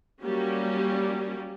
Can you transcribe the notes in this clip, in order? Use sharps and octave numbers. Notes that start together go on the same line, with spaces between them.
F#3 G3 A#3 C#4 G4